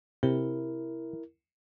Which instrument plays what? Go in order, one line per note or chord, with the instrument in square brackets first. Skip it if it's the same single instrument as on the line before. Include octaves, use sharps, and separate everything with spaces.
[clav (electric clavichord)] C3 [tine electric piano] E4 A#4